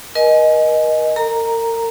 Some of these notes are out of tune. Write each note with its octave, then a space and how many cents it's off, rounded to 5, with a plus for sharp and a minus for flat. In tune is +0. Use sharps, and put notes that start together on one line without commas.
A#4 +40 D#5 +0 G#5 +25
A#4 -35 A#5 +0